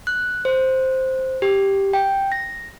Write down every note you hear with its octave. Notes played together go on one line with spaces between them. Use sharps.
F#6
C5
G4
G5
A#6